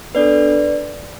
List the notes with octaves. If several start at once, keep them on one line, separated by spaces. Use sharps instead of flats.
B3 D4 A4 B4 D5